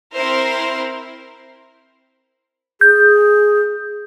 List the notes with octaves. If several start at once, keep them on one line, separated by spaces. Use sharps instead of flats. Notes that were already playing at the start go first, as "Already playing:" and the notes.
C4 E4 A#4 C5
G#4 G6